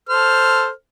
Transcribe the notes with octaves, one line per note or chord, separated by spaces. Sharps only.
A4 C5 F6